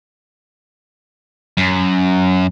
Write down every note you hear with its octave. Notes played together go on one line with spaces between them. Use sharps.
F#2